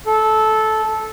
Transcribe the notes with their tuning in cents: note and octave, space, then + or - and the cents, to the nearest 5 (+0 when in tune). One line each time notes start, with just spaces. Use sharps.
A4 -15